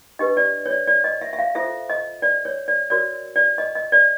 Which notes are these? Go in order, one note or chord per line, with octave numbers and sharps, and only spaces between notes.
D4 G4 B4 D#5
D5
C#5
D5
D5
D#5
E5
E5
F5
F4 A4 C5 E5
D#5
D5
C#5
D5
F#4 A#4 C#5 D5
D5
D#5
D#5
D5